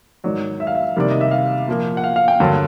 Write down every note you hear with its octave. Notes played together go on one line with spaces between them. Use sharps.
G#2 D#3 F#3 D5
E5
F5
E5
C3 D#3 G3 A#3 D5
D#5
E5
F5
A#2 F3 A#3
F#5
F5
F5
G5
G2 D3 F#3 A#3